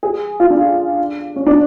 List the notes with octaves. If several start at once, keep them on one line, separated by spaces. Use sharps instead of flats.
G#4
F4
D4
C#4
D4